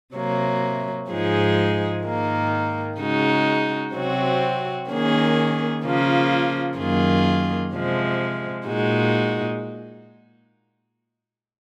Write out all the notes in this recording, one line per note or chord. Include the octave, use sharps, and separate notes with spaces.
C3 F#3 A#3
G#2 F3 G#3 D#4 G#4
G#2 D#3 A#3
C#3 G#3 D#4 F#4
C3 F#3 C4 F#4
D#3 A#3 C#4 G#4
C#3 F3 A#3 F4
F#2 D#3 A#3 F4 G#4
C3 F3 G#3
A#2 G#3 D#4 F#4